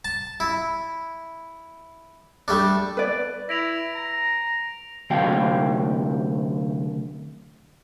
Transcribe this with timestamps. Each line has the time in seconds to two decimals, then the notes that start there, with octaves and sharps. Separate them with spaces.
0.05 A5
0.40 E4
2.48 G3 A3 D4
2.97 B4 D5
3.49 E4 A#6 D7 F7
3.95 A#5
5.10 D2 C3 F#3 F5 G5